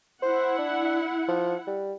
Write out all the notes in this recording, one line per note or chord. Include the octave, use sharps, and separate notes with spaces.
E4 C5 F#5
D4
F3
G3